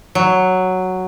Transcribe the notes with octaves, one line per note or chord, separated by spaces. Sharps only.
F#3